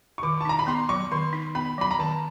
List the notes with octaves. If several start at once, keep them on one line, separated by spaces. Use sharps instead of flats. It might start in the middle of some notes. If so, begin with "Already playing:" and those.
C#6
D#3 D6
A5
D#4 A#5
B5
B3 C6
F#3 C#6
D#3 C6
D#4
B3 B5
F#3 B5
A#5
D#3 A5